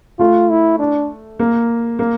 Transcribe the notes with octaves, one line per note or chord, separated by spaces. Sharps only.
A3 F4
E4
D4
A#3
A#3